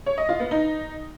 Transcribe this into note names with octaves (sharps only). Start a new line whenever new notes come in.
C#5
D#5
F4
B3
D#4